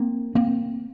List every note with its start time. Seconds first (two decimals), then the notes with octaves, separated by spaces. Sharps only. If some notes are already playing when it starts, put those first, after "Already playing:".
Already playing: A#3 C4
0.35 A#3 C4